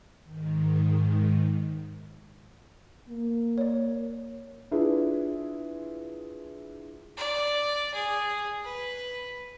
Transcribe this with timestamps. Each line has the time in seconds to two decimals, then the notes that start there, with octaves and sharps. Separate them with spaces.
0.25 G#2 D#3
3.09 A#3
3.58 C#5 D5
4.71 D4 E4 F4 G#4 B4
7.17 D5
7.94 G#4
8.64 B4